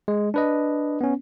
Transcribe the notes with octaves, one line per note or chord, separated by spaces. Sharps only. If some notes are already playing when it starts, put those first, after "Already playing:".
G#3
D4 B4 D#5
B3 C#4